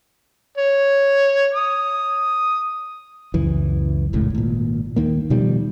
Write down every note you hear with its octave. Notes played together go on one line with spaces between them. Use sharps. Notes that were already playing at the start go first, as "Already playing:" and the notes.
C#5
D#6
C#2 F#2 E3
D#1 G#1 C#2 A2
G#1 A#2
D#2 D#3 A#3
B2 D#3 F3 G3